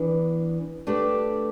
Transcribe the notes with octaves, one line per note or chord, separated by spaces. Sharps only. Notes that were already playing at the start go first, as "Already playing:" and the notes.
Already playing: E3 B3 D4
A3 D4 G4 B4